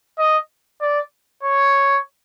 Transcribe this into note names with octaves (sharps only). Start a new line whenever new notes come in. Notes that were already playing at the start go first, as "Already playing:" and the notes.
D#5
D5
C#5